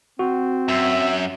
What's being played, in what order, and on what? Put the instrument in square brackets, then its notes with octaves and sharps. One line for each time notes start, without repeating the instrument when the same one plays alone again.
[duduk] C4 [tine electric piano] F#4
[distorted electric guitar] F#2 [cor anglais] E5